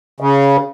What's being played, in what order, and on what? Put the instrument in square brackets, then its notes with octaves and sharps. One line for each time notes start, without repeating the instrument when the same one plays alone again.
[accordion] C#3